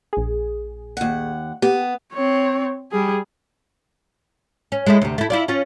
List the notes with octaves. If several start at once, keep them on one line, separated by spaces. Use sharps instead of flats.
A#1 G#4
D#2 F#5
B3 G4
C4 C#5
G3 G#4
C#4
G#3 A3 E4
D2 C3
A3 E4
E4 F4 D5
C#4 F4